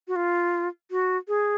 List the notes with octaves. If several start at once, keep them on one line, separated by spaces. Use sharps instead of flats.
F#4
F4
F#4
G#4